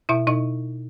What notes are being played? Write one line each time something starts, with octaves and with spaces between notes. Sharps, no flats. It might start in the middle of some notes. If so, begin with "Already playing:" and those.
B2 E4 E5
B2 D#4 D#5